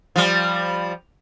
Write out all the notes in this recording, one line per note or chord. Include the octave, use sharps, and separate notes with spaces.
F3 G3